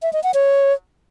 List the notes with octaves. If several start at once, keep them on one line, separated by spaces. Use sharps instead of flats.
E5
D#5
F#5
C#5